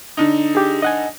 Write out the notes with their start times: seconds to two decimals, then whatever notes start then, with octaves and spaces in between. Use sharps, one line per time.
0.17 D3 D#4
0.55 G4 G#4
0.82 D#5 F#5 G#5